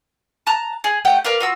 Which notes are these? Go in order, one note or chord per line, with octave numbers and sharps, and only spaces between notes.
A5 A#5 F#6
G#4
A3 G4 F#5 G5
A#4 B4 D5 F5
F4 F#4 E6